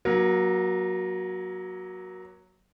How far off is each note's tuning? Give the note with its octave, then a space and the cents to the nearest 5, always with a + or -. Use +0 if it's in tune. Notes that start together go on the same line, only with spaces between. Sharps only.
F#3 +0 A#3 +30